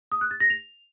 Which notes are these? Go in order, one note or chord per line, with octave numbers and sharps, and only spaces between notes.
D#6
F#6
A6
A#6
F7